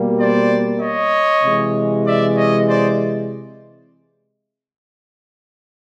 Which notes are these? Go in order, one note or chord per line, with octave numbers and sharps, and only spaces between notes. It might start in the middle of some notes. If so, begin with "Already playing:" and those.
Already playing: B2 G3 A#3
C5 D5
C#5 D#5
C3 E3 G#3
D5 E5
C#5 D#5
C5 D5